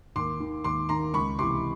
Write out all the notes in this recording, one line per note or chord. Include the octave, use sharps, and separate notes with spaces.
D#2 C6 D6
D#3
D#2 C6 D6
D#3 A#5 C6
C#2 B5 C#6
C3 E3 C6 D6